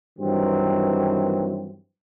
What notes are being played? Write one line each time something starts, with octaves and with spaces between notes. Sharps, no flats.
G2 D#3 E3 F#3 C4